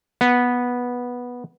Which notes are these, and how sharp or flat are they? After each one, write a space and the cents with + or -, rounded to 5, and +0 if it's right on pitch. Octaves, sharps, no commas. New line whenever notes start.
B3 -10